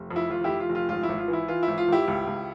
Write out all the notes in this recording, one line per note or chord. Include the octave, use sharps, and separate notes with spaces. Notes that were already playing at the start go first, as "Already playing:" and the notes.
Already playing: F1
F2
E4
F1 F4
F1 E4 G4
F4
F1
F4
G#1 F4
E4
G#1
F4
E3
E4
E3 F4
E4
G#1
F4
G#1 E4 G4
C#2
C#2